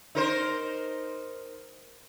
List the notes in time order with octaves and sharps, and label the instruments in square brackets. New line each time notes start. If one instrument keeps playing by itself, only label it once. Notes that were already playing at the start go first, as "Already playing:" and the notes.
[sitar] D#4 A#4 C5